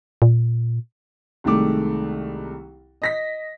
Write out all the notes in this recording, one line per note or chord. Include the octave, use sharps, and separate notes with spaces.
A#2
C2 D#3 G#3 A3 D6
D#5 A#6 B6